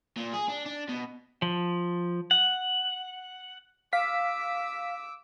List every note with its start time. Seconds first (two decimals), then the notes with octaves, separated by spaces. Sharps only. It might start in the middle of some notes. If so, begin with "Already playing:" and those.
0.17 A#2
0.34 G#4
0.49 D4
0.66 D4
0.89 B2
1.42 F3
2.31 F#5
3.93 F5 D6 E6 B6